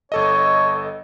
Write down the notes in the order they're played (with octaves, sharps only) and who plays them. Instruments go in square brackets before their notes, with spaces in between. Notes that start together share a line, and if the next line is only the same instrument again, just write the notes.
[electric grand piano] G1 A4 D#5 [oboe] C#5